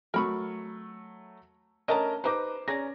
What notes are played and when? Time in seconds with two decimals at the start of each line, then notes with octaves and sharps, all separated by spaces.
0.14 F#3 A3 A#4 B5 C#6
1.88 A3 C#4 D4 A#4 D#5 A5 A#5
2.24 D#4 G4 B4 C5 A#5 D6
2.68 C#4 G#4 D5 A#5 A#6